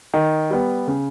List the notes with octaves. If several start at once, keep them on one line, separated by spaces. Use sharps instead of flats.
D#3
G3 B3
C#3